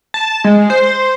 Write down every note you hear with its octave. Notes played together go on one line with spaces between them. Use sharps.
A5
G#3
C5